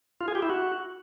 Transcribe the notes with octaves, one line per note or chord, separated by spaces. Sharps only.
F4
G#4
G4
E4
F#4